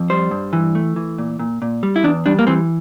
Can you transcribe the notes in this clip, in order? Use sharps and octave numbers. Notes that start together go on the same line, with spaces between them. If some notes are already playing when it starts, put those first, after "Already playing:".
Already playing: F2
G3 C5
G2
E3
A3
E3
A#2
A#2
A#2
G3
E4
E2 D4
G3 D4
A#3
E3 C4